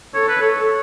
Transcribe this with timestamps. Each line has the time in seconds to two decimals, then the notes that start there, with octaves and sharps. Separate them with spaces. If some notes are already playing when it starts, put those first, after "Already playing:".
0.15 A4 C#5
0.29 B4
0.42 C#5